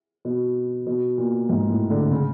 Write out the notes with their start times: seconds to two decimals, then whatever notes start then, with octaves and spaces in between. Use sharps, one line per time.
0.25 B2
0.86 B2
1.18 A#2
1.49 G#2
1.69 A2
1.90 D3
2.11 C#3